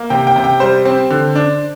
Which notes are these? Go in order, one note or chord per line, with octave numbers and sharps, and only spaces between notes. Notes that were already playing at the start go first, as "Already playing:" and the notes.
Already playing: A#3
C3 G5
G5
C3
G5
G3 C5
C4
D3
D4